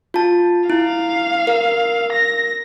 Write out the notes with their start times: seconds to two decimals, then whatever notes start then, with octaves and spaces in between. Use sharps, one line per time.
0.14 F4 A5
0.70 E4 F5
1.47 A#4
2.13 A#6